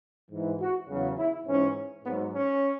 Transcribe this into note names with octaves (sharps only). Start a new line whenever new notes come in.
G#2 E3
F#4
E2 C#3 F#3
E4
G#2 E3 C#4
G#2 F#3 B3
C#4